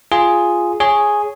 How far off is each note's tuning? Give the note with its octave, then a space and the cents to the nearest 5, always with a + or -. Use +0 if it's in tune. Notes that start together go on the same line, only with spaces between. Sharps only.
F4 -5 G#4 +0
G#4 +0 C#5 +0